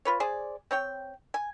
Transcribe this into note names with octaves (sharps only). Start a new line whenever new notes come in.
F4 B4 C#5
G#4 C5 D5
C4 C#5 G5
G#5